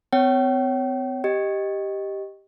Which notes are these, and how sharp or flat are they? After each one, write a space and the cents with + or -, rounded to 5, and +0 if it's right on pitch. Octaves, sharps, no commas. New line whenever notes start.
C4 -40 C#5 +0 G5 -45
G4 +0 D#5 +0